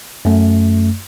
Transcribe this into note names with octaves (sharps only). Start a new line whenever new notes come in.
F#2 A3